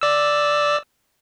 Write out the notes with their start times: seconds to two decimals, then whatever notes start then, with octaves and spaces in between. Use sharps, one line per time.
0.01 D5 E6